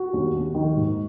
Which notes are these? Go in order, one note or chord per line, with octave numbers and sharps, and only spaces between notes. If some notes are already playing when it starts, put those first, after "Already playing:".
Already playing: F#4
D#2
D#2
D#3
G#2